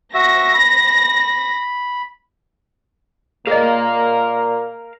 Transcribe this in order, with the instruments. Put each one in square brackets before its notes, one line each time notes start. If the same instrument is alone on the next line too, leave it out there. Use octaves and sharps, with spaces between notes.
[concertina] F#4 E5 [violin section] A#6
[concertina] B5
[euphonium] A#2 [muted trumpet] A#3 [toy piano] G#4 D#5 [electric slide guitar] A#4 F5